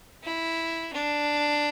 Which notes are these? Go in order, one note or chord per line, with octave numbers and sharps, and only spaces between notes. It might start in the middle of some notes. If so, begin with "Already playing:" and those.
E4
D4